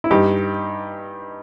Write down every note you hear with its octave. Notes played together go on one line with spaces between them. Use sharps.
E4
G2 D#4 G4